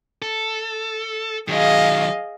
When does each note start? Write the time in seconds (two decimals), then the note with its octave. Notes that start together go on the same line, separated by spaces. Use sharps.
0.22 A4
1.48 D#3 F#3 G#4 D#5 F5